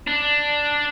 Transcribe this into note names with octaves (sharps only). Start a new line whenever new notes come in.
D4